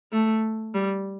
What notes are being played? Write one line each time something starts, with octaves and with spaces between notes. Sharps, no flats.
A3
G3